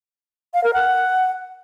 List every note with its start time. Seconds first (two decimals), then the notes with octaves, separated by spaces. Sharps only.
0.54 F5
0.64 A#4
0.74 F#5